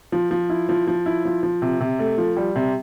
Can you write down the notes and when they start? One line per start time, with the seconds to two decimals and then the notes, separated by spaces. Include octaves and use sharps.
0.12 F3
0.31 F3
0.50 E4
0.69 F3
0.87 F3
1.06 E4
1.25 F3
1.43 F3
1.62 C3
1.81 C3
1.99 A3
2.18 F3
2.37 G3
2.56 C3